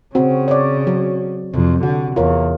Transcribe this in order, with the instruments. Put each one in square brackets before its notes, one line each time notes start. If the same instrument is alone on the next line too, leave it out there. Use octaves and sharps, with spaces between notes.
[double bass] C#3 [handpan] C4 F#4
[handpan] C#5 D5
F#3
[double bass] F2 [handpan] C3
[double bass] D3 [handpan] F#4
[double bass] E2 [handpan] F4 A#4 C#5